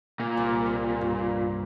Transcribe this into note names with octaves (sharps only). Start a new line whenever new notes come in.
A#2
C2
C4
G2